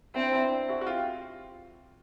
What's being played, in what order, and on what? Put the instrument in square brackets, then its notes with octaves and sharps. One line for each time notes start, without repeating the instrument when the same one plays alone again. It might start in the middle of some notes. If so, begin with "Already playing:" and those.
[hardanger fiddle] C4 [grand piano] D4 E4
[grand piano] D4 E4
E4 F#4
F#4
F4 G4